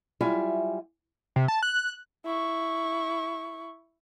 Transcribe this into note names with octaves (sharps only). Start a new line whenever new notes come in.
F#3 G3 E4 F4 E5 G#5
C3
A5
F#6
E4 C#6